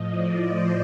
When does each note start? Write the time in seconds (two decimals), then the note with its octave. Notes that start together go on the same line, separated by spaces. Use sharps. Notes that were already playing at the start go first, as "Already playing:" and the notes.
Already playing: A2 F3 D#5
0.12 D5
0.41 C5